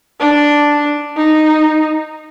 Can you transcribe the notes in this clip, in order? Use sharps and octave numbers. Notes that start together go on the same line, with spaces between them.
D4
D#4